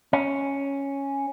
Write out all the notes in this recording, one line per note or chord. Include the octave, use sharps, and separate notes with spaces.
C#4